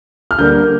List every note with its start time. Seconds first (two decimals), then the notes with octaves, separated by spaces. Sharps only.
0.31 F6
0.38 D3 G3 A#3 G6